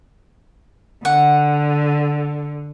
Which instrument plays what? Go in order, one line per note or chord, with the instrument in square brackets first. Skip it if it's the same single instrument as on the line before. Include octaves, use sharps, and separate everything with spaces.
[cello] D3 [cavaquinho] F#5